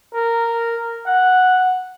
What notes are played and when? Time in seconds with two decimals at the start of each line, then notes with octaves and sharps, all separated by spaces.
0.15 A#4
1.07 F#5